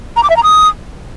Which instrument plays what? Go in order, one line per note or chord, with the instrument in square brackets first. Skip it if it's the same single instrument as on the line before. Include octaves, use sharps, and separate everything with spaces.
[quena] A#5
D6
E5
A#5
D#6